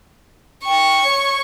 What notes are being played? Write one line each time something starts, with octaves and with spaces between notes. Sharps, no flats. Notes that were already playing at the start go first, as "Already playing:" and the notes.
G5 C#6
C#5